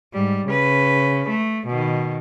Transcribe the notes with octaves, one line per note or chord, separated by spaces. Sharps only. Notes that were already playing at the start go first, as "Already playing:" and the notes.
G#2 G3
C#3 B4
A3
B2 D#3